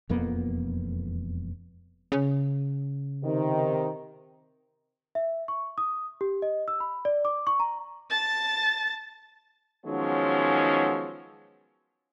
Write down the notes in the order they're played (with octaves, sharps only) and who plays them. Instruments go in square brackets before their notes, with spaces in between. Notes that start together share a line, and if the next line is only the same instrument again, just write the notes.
[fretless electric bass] E1 F2 A#3 B3
[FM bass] C#3
[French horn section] C3 D#3
[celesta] E5
C#6
D#6
G4
D#5
E6
B5
D5
D6
C#6
A#5
[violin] A5 A6
[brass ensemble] D#3 F3 F#3 G#3 B3 C#4